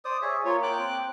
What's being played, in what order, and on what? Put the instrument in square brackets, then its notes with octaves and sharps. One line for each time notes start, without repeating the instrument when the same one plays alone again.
[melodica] C5 D5 D#6
G#4 C#5 E5
[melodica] A#3 [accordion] F4 C#5
[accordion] G5 D6 F#6
[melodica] C4